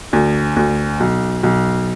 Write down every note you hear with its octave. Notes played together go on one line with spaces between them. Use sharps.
D2
D2
B1
B1